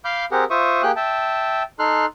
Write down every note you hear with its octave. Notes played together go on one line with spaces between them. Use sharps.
F5 B5 D6 F6 G6
C4 G4 G#4 A#4 F#5
F4 C5 E5 C#6 D#6
A#3 G4 G#4 G5 F#6
E5 G5 A5
D#4 A4 C6 F6 F#6